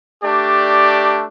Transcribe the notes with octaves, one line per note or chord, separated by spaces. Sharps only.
A3 D4 G4 D5